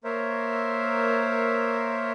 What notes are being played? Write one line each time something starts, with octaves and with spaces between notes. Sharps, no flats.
A#3 A#4 C5 C#5 E5